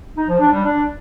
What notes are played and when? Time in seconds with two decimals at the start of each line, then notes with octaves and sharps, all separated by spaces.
0.16 D#4
0.28 F3
0.40 D4
0.52 G3
0.64 D4